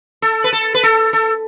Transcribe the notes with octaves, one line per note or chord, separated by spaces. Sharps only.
A4
B4
A4
B4
A4
A4